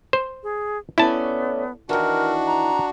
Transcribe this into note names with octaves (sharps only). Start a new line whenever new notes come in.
C5
G#4
A3 B3 C#4 E4 D5 A5
D#3 E3 D4 F#4 A#4
A#5